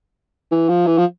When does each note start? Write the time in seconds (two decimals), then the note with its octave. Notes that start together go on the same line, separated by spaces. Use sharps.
0.52 E3
0.69 F3
0.87 E3
0.98 F3